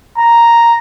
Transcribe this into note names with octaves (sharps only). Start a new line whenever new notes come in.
A#5